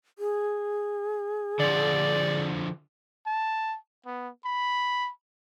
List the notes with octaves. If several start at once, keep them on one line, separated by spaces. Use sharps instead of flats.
G#4
D3 F3 D5
A5
B3
B5